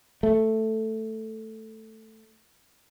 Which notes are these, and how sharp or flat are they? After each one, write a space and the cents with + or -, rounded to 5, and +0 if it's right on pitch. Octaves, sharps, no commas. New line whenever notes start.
A3 +5